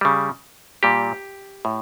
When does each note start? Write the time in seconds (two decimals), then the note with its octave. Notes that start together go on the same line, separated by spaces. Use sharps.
0.01 C#3 G3
0.83 A#2 G3 G4
1.65 A2